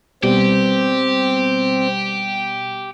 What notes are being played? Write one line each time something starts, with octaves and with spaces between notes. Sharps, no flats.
B2 G3 B3 C4 G4